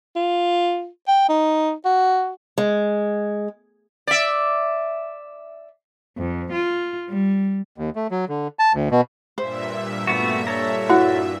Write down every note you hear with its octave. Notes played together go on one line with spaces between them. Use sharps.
F4
G5
D#4
F#4
G#3
D5 E5
F2
F4
G3
D#2
A3
F#3
D3
A5
D2
B2
G2 A#2 C5 E5
A3 B3 F#4
A4 C#5 A#5
E4 F#4 F#5